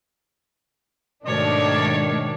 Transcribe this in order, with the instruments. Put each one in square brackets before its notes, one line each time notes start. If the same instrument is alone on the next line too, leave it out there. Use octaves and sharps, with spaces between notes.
[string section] G#2 D#3 D4 [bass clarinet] B2 [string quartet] A3 C#5 [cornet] D5